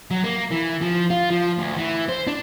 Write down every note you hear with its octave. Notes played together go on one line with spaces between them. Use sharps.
F#3
A#3
E3
F3
F4
F3
D2
E3
C5
D4